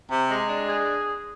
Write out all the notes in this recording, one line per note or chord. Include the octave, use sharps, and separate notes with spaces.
C3
G#3
D4
G#4